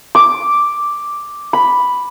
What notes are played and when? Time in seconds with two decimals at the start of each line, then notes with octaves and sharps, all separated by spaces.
0.15 D6
1.53 B5